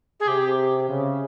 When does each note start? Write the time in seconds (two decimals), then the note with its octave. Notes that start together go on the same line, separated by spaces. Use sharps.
0.20 G#4
0.27 C3 G4
0.88 C#3